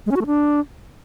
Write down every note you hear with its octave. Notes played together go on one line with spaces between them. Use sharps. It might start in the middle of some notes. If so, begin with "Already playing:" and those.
G#3
C#4
F#4
A3
D4